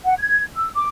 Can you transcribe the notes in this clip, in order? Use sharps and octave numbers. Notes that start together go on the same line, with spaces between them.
F#5
G#6
E6
D6